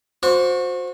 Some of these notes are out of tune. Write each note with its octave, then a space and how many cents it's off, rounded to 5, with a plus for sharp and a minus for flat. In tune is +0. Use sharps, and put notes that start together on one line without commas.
F#4 -35 C5 +0 C#6 +40